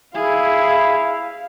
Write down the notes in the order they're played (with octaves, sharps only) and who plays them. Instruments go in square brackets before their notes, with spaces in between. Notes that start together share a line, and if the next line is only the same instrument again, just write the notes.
[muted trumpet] E4 [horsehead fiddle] G#4 [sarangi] F5